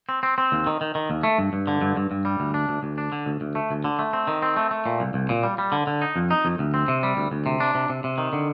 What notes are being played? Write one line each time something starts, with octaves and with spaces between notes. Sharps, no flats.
C4
C4
C4
D#2
D#3
D#3
D#3
D#2
A3
G2
G2
D3
G2
G2
G2
G3
D2
D4
D2
D2
D4
D3
D2
D2
A3
D2
D3
A3
C4
D#3
C4
A3
A3
A#2
C2
C2
A#2
G3
G3
D3
D3
D#4
F2
D#4
F2
D2
C4
C3
G3
D2
D2
C3
D4
C3
C3
C3
D#3
D3